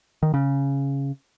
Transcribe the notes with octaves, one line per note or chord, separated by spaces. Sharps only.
D#3
C#3